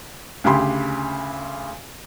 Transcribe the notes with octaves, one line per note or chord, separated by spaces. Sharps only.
D2 C#3 G4 G#5 B5 C6